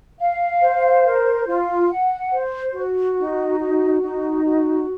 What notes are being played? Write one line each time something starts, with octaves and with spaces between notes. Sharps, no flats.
F5
C5
A#4
F4
F#5
C5
F#4
D#4
F#4
D#4
F#4